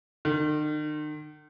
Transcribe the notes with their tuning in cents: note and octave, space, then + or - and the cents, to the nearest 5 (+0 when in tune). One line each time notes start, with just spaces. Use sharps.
D#3 -40